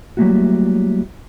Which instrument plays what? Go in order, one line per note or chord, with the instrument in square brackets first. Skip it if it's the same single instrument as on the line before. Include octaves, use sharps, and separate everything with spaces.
[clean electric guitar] F#3 G3 A3 A#3 E4 F#4